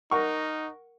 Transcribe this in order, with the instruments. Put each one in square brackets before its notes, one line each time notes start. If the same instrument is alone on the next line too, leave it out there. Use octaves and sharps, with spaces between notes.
[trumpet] D#4 [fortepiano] A#4 F#5 C#6